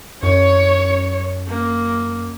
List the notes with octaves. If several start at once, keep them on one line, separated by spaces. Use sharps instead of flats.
F#2 C#5
A#3